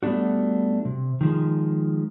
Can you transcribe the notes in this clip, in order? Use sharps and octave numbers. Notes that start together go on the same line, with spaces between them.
G3 A3 B3 D4 F#4
C3
D#3 F3 G#3